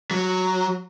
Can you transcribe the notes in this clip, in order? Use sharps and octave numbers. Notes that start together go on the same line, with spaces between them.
F#3